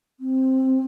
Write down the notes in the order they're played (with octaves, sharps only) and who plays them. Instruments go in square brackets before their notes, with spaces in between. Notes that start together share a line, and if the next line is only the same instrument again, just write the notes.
[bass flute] C4